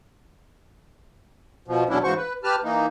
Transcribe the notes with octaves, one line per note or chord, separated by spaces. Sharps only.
B2 F3
E2 B2 F#3 C#4 D4 E4
G#2 C#3 E3 F#4 C5 C#6
B4
G4 B4 A5 F6
E3 A#3 D#4